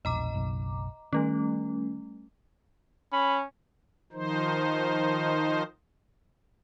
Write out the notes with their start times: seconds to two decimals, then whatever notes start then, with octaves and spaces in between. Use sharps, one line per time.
0.05 E1 A#1 D#5 A#5 D6
0.34 F#1 B1
1.13 D#3 G3 A3 C#4
3.13 C#4 B5
4.13 D#3 F3 D#4 C5